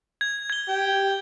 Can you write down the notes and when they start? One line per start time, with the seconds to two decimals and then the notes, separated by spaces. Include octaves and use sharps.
0.21 G#6
0.50 G#6 G7
0.69 G4